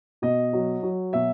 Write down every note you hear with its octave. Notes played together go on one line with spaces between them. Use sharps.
B2 D#5
F#3
F#3
B2 E5